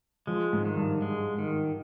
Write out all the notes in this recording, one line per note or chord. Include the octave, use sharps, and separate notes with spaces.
F3 G#3
G#2
D#3
G2
G#3
D#3